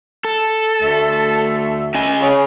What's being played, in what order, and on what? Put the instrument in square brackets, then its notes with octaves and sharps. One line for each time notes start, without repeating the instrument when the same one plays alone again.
[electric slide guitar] A4
[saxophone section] D2 A3 E5
[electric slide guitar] C#4 D#5 G#5
[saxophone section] C#3